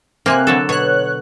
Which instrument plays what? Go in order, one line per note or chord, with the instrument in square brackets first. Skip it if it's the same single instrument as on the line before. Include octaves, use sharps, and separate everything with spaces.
[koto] C3 A#3 [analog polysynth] C4 G#5 F#6
[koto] D3 F#3 A4
[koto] B2 [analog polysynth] C#5 F#6